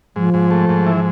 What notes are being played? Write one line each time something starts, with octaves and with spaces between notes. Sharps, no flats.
G#2 F3
G#2
A3
G#2
E3